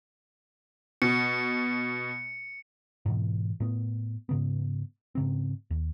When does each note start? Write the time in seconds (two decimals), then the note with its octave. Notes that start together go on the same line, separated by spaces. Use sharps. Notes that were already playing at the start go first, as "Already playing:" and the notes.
1.02 B2 C#7
3.06 G#2 B2 E3
3.60 A2 B3
4.29 G#2 C#3 B3
5.15 G#2 C#3 C4
5.71 D#2